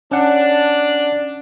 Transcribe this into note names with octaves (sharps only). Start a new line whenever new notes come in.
C#4 D4 F#5